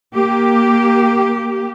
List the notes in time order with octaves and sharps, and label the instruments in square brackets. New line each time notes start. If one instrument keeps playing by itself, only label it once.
[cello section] A#3 G4